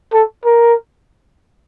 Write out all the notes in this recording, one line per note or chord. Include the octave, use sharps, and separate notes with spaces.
A4
A#4